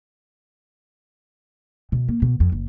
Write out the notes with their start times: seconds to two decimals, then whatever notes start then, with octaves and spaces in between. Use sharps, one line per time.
1.92 B2
2.08 A#3
2.22 B2
2.40 F2
2.52 F#1